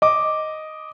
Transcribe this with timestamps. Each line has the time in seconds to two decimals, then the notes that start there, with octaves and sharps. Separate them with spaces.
0.02 D#5 D6